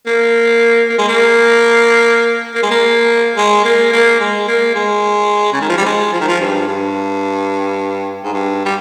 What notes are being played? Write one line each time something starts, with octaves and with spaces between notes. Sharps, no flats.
A#3
A#3
G#3
A#3
A#3
G#3
A#3
G#3
A#3
A#3
G#3
A#3
G#3
C#3
D#3
F3
G3
G#3
F3
D#3
F3
G2
G2
G#2
G2
G3